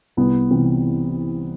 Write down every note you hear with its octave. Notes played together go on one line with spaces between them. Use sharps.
C2 B3
C3 E3